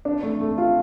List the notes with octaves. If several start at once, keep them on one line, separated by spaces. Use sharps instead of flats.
D4
A3
A3
F4